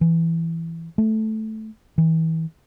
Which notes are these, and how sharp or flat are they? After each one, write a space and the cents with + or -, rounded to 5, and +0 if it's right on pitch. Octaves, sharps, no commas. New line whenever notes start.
E3 +5
A3 -10
E3 -35